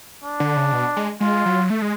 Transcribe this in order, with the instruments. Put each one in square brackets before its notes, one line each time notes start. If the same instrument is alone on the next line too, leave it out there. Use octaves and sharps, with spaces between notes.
[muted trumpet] D4
[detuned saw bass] D3
C#3
B2
G#3
[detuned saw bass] G#3 [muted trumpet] F4
[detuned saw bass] F#3
A3
G#3